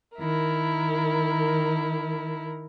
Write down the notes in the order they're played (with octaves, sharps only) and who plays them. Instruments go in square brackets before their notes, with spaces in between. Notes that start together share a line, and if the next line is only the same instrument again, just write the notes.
[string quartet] D#3 E4 A#4